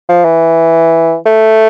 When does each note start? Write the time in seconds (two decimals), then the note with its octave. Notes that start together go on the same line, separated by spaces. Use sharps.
0.09 F3
0.25 E3
1.26 A3